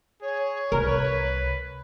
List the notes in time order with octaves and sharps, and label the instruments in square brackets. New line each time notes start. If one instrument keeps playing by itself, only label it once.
[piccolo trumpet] G#4 [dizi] C#5
[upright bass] C2 [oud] A#4 [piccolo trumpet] B4